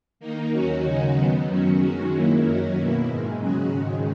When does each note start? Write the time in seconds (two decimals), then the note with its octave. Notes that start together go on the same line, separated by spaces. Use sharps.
0.20 D#3 A#3 D#4
0.52 D#2 D#3 F#3 C#4 F#4
0.84 C#3 G#3 D#4 F#4
1.16 D#3 F#3 B3
1.48 F#2 D#3 F#3 C#4 F#4
1.79 D#3 G#3 C#4 F#4
2.12 D#3 F#3 A#3 E4
2.44 F#2 D#3 F#3 C#4 F#4
2.75 B2 A#3 E4
3.07 G#2 D#3 G#3
3.39 C#3 F#3 C#4 F#4
3.71 G#2 D#3 G#3